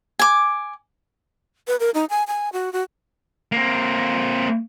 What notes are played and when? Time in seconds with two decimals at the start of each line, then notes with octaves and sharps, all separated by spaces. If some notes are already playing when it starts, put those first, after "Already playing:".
0.19 G#5 D6
1.67 B4
1.80 A#4
1.94 D#4
2.10 G#5
2.27 G#5
2.53 F#4
2.73 F#4
3.52 A#3 C4